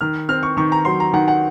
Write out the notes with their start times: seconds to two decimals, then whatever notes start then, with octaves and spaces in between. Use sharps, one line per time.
0.01 D#3 F6
0.29 C4 F6
0.43 C#6
0.57 D#3 C#6
0.72 A#5
0.85 F#3 C6
1.00 A#5
1.13 D#3 F#5
1.28 F#5